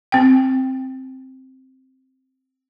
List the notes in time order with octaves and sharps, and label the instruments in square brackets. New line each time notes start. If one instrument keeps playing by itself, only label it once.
[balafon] C4 G5